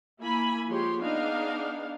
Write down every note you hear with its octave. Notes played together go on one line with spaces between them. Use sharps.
A#3 E4 G#5 B5
F3 G#3 G4 C#5 C6
B3 D4 D#4 G#4 F5